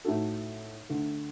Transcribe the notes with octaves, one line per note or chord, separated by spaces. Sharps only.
A2 A3 D#4 F#4 A4
D2 D3 A3